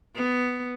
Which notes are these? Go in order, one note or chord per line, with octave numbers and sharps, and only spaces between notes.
B3